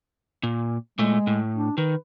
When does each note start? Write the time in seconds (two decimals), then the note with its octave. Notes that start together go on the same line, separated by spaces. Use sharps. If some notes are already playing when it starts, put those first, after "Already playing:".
0.43 A#2
0.99 A#2 G#3 A3
1.27 A2
1.56 D4
1.78 D#3 B4